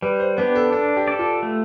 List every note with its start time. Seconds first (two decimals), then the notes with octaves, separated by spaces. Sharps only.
0.02 G3 B4
0.20 C5
0.38 B3 D4 G4 B4
0.55 A4
0.72 D4 A4
0.96 G4
1.08 A4 D5
1.19 F4
1.43 A3